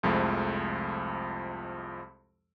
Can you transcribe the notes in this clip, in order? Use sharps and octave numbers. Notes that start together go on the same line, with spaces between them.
C2 F2 F3 G#3 A3